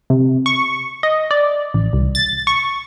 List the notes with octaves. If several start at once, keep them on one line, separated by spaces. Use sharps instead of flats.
C3
C#6
D#5
D5
A1
C2
A6
C#6